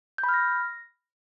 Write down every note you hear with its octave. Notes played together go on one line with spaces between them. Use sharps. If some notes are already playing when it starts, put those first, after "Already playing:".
G6
B5
F6
A#6